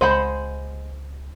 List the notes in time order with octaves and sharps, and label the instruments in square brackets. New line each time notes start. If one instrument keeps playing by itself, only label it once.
[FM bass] C#2 [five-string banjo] G#3 F#5 B5 [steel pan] C5